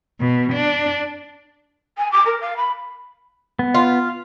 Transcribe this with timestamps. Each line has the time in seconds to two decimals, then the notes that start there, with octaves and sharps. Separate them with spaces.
0.20 B2
0.53 D4
1.97 G#5
2.11 D6
2.25 A#4
2.40 F5
2.56 B5
3.59 B3
3.74 F4